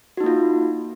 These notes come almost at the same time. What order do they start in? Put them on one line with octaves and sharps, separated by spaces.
F#4 D#4 A#3 F4